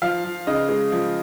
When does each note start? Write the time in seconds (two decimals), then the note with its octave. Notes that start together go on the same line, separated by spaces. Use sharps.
0.02 F3 F5
0.24 F3
0.47 C#3 D#5
0.69 G#3
0.92 F3